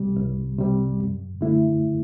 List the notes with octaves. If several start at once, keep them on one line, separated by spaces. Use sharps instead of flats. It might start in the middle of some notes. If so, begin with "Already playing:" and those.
Already playing: C2 C3 G3
C2
C3 G3
F#2
D3 A3 E4